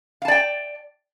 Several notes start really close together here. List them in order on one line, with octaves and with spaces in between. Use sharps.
F5 A5 D5 G5